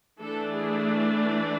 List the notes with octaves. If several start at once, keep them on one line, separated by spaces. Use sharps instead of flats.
E3 A3 D4 A4
G#4